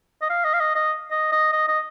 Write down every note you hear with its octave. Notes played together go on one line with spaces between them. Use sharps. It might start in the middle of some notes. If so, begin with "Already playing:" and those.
D#5
F5
D#5
F5
D#5
D#5
D#5
D#5
D#5
D#5